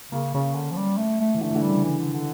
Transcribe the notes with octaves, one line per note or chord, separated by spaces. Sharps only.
C#3 A#3
C#3 C#4
D3
F3
G3
A3
A3
E3
D3 A3
E3
D3
G3
C#3
E3
D3
D3